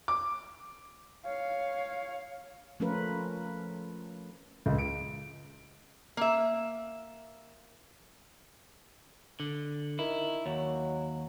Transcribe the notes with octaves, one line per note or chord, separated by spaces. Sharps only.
D6
C#5 F5
F3 A3 C#4 F4 A#4 B4
C#2
D7
A#3 E5
D3
D#3 E4
D#2 F#3